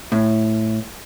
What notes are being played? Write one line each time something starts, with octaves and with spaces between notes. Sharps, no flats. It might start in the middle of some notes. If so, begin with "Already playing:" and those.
A2